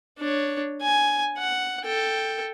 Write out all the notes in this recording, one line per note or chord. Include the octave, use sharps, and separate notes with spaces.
D4 C#5
G#5
F#5
A4 G5